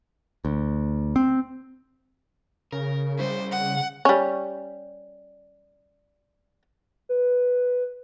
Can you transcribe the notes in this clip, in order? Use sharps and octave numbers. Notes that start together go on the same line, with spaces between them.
D2
C4
C#3 A#4
G3 E4 C5
F#5
G3 C#4
B4